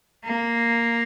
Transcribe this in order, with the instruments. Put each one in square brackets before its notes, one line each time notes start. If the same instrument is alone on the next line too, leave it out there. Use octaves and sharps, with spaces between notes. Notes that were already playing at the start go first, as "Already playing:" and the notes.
[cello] A#3